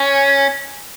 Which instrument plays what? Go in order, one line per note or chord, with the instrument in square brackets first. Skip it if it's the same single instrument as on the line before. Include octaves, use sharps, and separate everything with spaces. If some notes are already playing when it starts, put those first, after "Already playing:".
Already playing: [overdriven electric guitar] C#4